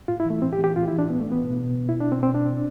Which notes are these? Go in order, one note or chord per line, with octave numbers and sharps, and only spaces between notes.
A2 F4
E4
E3 A3
A2 C4
G4
E3
G4
A2 F4
E4
E3
D4
A2 B3
A3
E3 B3
B2
B2
B2
E4
B2
D4
B2 C4
C4
B2
D4
B2